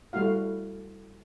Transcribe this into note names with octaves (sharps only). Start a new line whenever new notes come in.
G3 A3 E4 F#4 F5